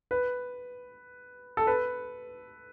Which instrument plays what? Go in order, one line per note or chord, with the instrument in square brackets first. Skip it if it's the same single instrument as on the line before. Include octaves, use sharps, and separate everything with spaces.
[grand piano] B4
A4
B4